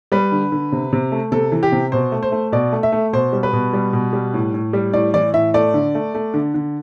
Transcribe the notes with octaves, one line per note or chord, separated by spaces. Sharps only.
G3 B4
D3
D3
C3
C3
A3
C3 A4
E3
G4
C3
B2 C5
A3
C5
A3
B2 D5
A3
E5
A3
B2 C5
G3
B4
B2
G3
B2
G3
A2
A2
G3
A2 D5
E3 D5
A2 E5
A3 D5
D3
A3
A3
D3
D3